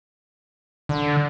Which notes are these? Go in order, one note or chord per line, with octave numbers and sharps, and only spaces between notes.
D3